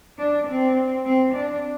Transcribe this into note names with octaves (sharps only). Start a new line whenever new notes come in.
D4
C4
C4
D4